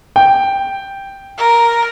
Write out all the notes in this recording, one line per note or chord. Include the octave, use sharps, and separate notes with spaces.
G5
A#4